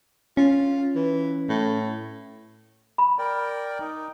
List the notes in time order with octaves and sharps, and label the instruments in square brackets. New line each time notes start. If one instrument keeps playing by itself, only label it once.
[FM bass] C#4 [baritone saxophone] F4
[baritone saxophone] E3
A2
[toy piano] B5
[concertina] A#4 D5 G5
D#4